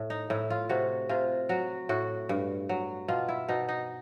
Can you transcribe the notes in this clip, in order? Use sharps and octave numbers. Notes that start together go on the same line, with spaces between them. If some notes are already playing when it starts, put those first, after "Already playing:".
Already playing: A2
D#4
A2 E4
F4
C3 F#4
C3 F4
F#3 F#4
A2 F#4
G2
F#3
B2 F4
E4
B2 D#4
D#4